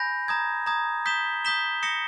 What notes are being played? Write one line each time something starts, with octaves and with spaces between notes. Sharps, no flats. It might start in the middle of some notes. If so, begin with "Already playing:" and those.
Already playing: G#5 B5 G6 A#6
A#5 D#6 G#6
A#5 D#6 G#6
D#6 G6 B6 E7 G7
D#6 G6 B6 E7 G7
D#6 A#6 C#7 E7 G7